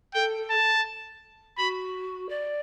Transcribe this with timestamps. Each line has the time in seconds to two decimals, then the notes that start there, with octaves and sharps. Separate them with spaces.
0.14 A4 G5
0.50 A5
1.57 F#4 B5
2.28 D5